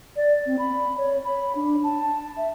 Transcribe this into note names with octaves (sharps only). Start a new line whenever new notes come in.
D5
C4
B5
C#5
B5
D4
A5
E5